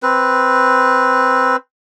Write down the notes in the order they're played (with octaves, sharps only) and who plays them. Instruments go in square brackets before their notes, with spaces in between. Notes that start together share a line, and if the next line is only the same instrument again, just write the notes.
[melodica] C4 B4